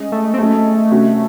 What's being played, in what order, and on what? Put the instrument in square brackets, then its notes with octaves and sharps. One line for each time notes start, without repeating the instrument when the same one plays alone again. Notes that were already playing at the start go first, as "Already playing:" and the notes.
Already playing: [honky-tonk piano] G#3 C#4 G#4 D#5
[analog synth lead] A3
C4
[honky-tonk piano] F#3 C#4 G#4 D#5 [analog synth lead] A3
[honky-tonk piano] C3 F#3 C#4 F#4